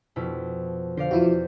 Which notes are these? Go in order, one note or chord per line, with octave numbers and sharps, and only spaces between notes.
F2 B2 E4
D3 C5 D5 F5
E2 F3 E4 F#4